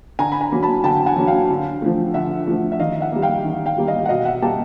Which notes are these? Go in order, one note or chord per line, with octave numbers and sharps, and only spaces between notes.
D3 G#5 A#5
B5
G#5 A#5
F#3 A#3
A5 B5
D3 G5 A5
G5
F#5 G#5
F#3 A#3
F5 G5
D3
F3 A3
D3 E5 F#5
F3 A3
E5
D#3 D#5 F5
E5 F#5
G3 A#3
F5 G5
D#3
F5 G5
G3 A#3
D#5 F5
F#5
B2 D#5 F5
E5 F#5
G3 A#3 G5 A5